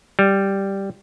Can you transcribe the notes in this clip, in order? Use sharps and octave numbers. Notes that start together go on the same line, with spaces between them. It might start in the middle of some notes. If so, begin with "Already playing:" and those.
G3